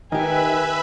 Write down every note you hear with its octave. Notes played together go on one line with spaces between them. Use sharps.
D#3 D#4 G4 B4 E5 G#5 B5